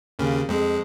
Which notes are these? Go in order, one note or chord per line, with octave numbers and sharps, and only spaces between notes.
D#2 C#3
F2 G#3